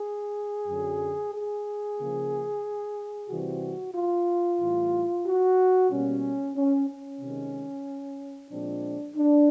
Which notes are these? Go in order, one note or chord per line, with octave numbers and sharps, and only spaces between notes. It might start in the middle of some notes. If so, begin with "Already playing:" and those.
Already playing: G#4
F#2 D3 F#3
G#4
C#3 F3 A#3
C3 E3 G3 C4 F#4
F4
A2 E3 G3
F#4
B2 G3 A#3 C#4
C#4
C#4
C3 D#3 G#3
A#2 F3 G#3 C4 D4
D4